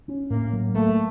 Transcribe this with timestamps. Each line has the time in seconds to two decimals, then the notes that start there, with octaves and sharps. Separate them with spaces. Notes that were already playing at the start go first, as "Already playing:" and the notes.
0.08 C#4
0.30 A2 A#3
0.53 F#3
0.74 A3 A#3